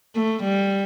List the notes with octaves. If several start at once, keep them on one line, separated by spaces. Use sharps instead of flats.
A3
G3